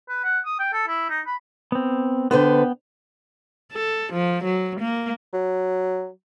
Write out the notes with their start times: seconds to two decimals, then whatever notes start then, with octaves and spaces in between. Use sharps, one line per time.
0.09 B4
0.24 F#5
0.45 D#6
0.60 G5
0.73 A4
0.88 E4
1.10 D#4
1.27 B5
1.72 B3 C4
2.31 D3 B3 B4 C5 G5
3.72 A4
4.13 F3
4.44 F#3
4.80 A#3
5.33 F#3